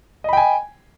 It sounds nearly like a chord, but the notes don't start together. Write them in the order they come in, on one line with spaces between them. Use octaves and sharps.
D#5 B5 G5 G#5